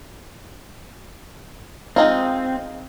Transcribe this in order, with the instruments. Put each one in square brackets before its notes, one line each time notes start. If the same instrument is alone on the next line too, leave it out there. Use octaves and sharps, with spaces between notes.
[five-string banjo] G#3 D#4 F4 [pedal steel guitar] C4